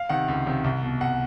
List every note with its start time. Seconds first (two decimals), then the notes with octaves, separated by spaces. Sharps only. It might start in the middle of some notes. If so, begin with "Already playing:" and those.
Already playing: F5
0.09 C3 D#3 F#5
0.28 C#2
0.46 C3 D#3
0.64 C2
0.83 B2
1.01 C2 F#5